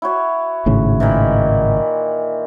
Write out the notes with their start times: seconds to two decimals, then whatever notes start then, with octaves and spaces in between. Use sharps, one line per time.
0.02 E4 F#4 C#5
0.66 G#1 A2 C#3
1.00 A#2 D#3 E3